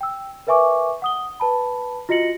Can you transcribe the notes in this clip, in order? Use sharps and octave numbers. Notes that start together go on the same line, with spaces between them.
G5 E6
A#4 B4 E5 G#5 C#6 D6
F#5 D#6 G7
B4 A5 B5
F4 F#4 D#5 A#6 C#7 F#7